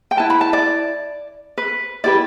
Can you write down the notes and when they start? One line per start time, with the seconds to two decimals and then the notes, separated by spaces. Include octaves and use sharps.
0.11 G5
0.17 E4 B4 A5
0.30 B5
0.41 A5
0.53 D5
1.58 B4
2.04 E4 G4 B4 D5